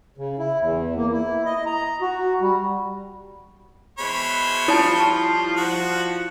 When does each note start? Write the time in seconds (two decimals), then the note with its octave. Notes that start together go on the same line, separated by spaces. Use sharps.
0.18 C#3
0.39 E4
0.59 E2
0.96 A#3
1.12 E4
1.45 D#5
1.66 A#5
2.02 F#4
2.41 G3
3.99 B2 E3 G#3 C5 C#5 B5
4.68 F3 G3 E4 F4 A5
5.57 F3 F#4